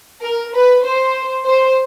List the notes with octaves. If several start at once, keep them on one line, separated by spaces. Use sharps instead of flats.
A#4
B4
C5
C5